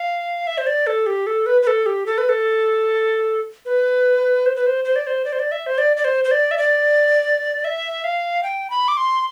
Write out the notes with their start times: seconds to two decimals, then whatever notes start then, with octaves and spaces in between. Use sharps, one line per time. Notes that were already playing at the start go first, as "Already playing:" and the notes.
Already playing: F5
0.47 E5
0.58 C5
0.66 D5
0.87 A4
1.07 G4
1.27 A4
1.46 B4
1.62 B4
1.67 A4
1.86 G4
2.06 A4
2.18 B4
2.29 A4
3.65 B4
4.46 C5
4.56 B4
4.66 C5
4.85 C5
4.96 D5
5.07 C5
5.25 D5
5.32 C5
5.39 D5
5.52 E5
5.66 C5
5.78 D5
5.97 D5
6.04 C5
6.24 C5
6.31 D5
6.51 E5
6.58 D5
7.64 E5
8.04 F5
8.43 G5
8.70 B5
8.88 D6
8.97 C6